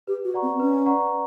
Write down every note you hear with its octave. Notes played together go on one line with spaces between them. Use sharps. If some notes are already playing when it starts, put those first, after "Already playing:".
G4 B4
F#4
D5 F#5 A#5 C#6
C4
C#4 B4
D5 F#5 A#5 C#6